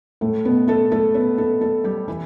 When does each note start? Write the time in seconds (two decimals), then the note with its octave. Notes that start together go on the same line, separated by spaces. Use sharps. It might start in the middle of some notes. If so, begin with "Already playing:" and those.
0.21 A2 A3
0.45 B2 B3
0.68 A3 A4
0.92 A3 A4
1.14 B3 B4
1.38 A3 A4
1.61 A3 A4
1.84 G3 G4
2.08 E3 E4